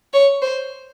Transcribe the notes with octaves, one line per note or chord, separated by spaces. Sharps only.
C#5
C5